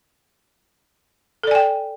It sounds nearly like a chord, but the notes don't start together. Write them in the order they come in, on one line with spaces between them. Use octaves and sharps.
A4 D5 G#5 G5